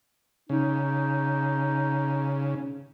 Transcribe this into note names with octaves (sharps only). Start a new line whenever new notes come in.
C#3 D#4